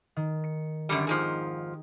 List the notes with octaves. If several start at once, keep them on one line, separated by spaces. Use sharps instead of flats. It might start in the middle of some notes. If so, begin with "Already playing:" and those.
D#3
C#7
F#2 D3 G3 G#6 C#7
F2 G#2 F3 D#4 G4 G#4